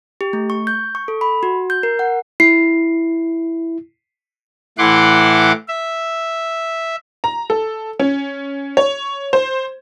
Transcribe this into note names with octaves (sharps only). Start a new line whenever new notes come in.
G4
A3
C#6
G6
C#6
A4
B5
F#4
G6
A#4
F#5
E4 C7
A2 E3 E4 F#5 C6 D6
E5
A#5
A4
C#4
C#5
C5